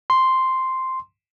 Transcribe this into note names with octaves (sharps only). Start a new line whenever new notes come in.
C6